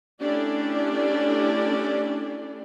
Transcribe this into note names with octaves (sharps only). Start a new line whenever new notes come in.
A3 C#4 D4 E4 G4 D5